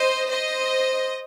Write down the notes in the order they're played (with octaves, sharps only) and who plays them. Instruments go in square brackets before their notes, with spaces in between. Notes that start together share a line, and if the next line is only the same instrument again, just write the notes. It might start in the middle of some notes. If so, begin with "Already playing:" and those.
Already playing: [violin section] C5 D#5
C5 D#5